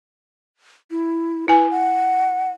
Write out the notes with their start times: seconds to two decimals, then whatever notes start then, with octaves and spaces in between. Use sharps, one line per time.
0.91 E4
1.48 E4 B4 G#5
1.71 F#5